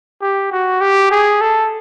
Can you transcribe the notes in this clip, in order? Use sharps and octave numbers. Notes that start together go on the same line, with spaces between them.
G4
F#4
G4
G#4
A4